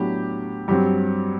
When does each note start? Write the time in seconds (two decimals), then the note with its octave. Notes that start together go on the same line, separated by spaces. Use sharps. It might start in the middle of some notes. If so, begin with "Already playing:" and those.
Already playing: A2 F#3 B3 D4 G4
0.68 G2 F#3 C4 G4